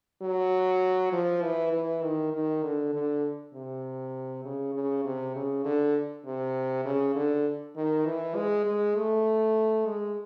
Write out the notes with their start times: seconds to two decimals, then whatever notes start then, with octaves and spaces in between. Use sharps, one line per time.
0.22 F#3
1.12 F3
1.42 E3
1.73 E3
2.03 D#3
2.33 D#3
2.63 D3
2.94 D3
3.54 C3
4.45 C#3
4.74 C#3
5.05 C3
5.35 C#3
5.64 D3
6.25 C3
6.85 C#3
7.15 D3
7.76 D#3
8.06 E3
8.36 G#3
8.66 G#3
8.96 A3
9.87 G#3